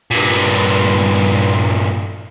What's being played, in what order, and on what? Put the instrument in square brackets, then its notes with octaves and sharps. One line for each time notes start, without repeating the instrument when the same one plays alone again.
[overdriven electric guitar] G2 A#2